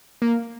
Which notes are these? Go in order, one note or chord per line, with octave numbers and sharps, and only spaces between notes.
A#3